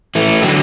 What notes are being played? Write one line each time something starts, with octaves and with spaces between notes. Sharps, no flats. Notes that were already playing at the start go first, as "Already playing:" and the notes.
E3 A3
D3 F#3